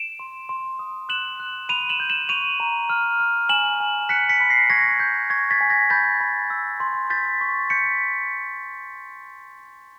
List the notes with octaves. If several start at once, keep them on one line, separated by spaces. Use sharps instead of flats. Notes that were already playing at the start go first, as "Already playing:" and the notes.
Already playing: D7 E7
C6
C6
D#6
F#6 E7 F#7
F#6
B5 D#7 F7
E7 F#7
G6
E7 F#7
C#6 D#7 F7
A#5
F6
F6
G#5 E7 F#7
G#5
F#6 B6 C#7
B6 C#7
B5
A#6 C7
C#6 G#6 A#6
G6
C#6 G#6 A#6
A6 B6
G#5
G#6 A#6
B5 G6 A6
B5
E6
C6
G6 A6 B6
C#6
G6 B6 C#7